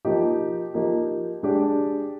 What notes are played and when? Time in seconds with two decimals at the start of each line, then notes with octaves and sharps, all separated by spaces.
0.05 F3 A#3 D#4 G4
0.74 F3 A#3 D#4 G4
1.43 G#3 D4 G4 D5